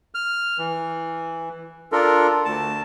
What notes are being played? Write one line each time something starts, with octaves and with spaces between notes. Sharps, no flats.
F6
E3
D4 F4 A4 A#4
D2 A5